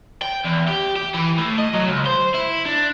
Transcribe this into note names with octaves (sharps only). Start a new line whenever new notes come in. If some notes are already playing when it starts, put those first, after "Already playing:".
G5
E2
G4
G4
E3
A2
D#5
F#3
C#2
C5
E4
D4